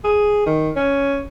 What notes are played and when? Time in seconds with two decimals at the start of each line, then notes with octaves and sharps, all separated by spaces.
0.04 G#4
0.46 D#3
0.76 C#4